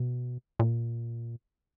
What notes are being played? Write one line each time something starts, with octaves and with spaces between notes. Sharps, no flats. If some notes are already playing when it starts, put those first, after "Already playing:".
Already playing: B2
A#2